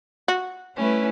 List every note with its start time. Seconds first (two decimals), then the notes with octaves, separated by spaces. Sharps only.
0.28 F#4
0.77 G3 A3 C#4 E4 B4